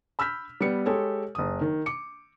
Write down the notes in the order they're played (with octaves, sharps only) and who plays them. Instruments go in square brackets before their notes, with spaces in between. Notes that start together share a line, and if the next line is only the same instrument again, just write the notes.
[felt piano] B5 E6 F6 G6 B6
G3 B3 C#7
G#3 G4 A4 C#5
F#1 D#6
D#3
D6 C#7